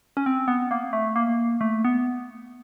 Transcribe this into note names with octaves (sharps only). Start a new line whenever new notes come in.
C#4
C4
B3
A#3
A3
A#3
A3
B3